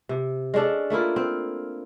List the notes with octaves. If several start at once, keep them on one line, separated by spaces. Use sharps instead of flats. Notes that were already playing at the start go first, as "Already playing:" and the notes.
C3
G#3 C#4 D4 A4
A3 A#3 E4 F4
C4